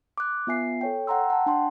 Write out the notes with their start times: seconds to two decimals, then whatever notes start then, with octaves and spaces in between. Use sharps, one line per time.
0.18 D6 F#6
0.47 B3 F4 E5 G#5 C7
0.81 A4 C#5 G5
1.07 F#5 G5 A#5 C6 E6
1.30 F#5 A5
1.46 D4 G5 A5 C6